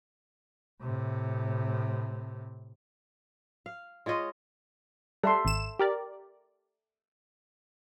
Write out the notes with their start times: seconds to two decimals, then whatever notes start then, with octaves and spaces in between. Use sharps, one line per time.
0.82 A2 C3
3.66 F5
4.06 G#3 F4 C#5 D#5
5.23 G3 A4 E5 C6
5.45 G#1 E7
5.80 G4 A#4 D5